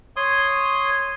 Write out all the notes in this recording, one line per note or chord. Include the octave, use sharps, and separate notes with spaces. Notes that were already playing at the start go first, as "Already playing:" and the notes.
C#5 C6 D#6